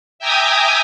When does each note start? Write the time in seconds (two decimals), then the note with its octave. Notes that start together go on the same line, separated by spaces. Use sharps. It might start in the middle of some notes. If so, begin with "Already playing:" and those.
0.19 E5 G5 G#5 A#5 D6 D#6